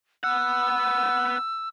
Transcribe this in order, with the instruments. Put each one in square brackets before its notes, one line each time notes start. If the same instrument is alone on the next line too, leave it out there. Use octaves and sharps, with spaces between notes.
[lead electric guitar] B3 F#5 [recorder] E6